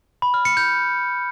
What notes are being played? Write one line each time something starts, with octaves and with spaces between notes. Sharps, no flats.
B5
F6
C#7
G6